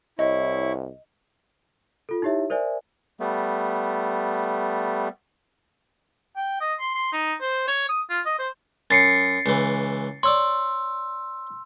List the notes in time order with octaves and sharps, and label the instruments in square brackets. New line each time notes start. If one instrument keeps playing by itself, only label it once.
[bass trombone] C2 [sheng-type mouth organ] E4 C#6 [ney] C#5 [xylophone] D#5
[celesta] F4 A4
D#4 E4 G4 C#5 E5
A#4 C5 D5 E5 G#5
[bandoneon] G3 A3 B3
[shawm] G5
D#5
C6
C6
D#4
C5
C#5
D#6
F4
D#5
C5
[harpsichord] F#2 [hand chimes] A6 C7 C#7
[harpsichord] C#2 E3
[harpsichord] C#5 D5 [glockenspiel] C6 E6